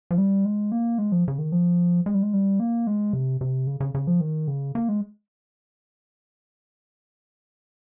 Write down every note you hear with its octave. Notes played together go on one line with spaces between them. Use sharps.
F3
G3
G#3
A#3
G#3
F3
C#3
D#3
F3
G#3
G3
G#3
G3
A#3
G#3
C3
C3
C#3
C#3
C#3
F3
D#3
C#3
A#3
G#3